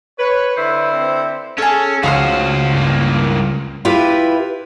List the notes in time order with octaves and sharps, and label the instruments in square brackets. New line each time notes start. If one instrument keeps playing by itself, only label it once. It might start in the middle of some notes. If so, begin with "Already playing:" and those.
[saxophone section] B4 [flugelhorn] C#5
[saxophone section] D3 E4 C5 [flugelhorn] B4
[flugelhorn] C4
[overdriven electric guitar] C#4 [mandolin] G#4 A4
[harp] C#2 [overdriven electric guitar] F#4 C5 [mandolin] F5 D#6 F6
[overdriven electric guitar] G2 A#3
[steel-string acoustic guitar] E4 F4 G4 B4